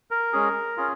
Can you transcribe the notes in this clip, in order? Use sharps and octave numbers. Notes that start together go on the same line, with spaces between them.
A#4
G#3 C#4 G#4
C#4 F4 G#4